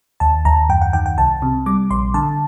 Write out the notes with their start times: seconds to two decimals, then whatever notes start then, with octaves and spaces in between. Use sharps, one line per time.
0.20 D#2 A5
0.45 D#2 A#5
0.69 F#2 G5
0.82 F#5
0.93 D#3 G5
1.06 G5
1.18 C2 A5
1.42 C3
1.66 G3 D6
1.91 A#1 C6
2.14 D3 A5